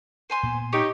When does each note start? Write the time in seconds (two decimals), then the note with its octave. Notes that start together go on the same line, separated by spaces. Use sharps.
0.30 C5 G#5 C6
0.43 A#2 B3
0.73 D#4 G4 C#5